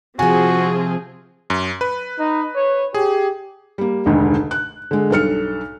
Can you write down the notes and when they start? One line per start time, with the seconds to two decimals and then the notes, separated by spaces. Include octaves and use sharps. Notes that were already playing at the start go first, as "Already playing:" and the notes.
0.19 C3 F3 C4 F4 F#4 G#4 G#5
1.50 F#2
1.81 B4
2.19 D#4
2.56 C#5
2.94 G4 G#4
3.78 G3 A#3
4.06 F1 D2 G#2 D3 D#3
4.51 F#6
4.91 D3 G#3
5.10 B1 G2 A4 F6 C#7